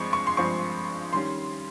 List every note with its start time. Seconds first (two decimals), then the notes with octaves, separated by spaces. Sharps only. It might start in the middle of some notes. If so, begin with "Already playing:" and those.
Already playing: G2 F3 G#3 C4 C#6
0.13 C#6
0.27 C6
0.37 G2 F3 G#3 C4 C#6
1.13 D#3 G3 C#4 C6